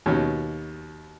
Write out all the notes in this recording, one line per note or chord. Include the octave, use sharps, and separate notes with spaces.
D#2 B2 C#4